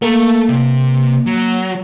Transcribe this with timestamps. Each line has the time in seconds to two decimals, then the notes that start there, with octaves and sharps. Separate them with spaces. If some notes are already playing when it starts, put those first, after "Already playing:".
0.02 A3 A#3
0.49 C3
1.26 F#3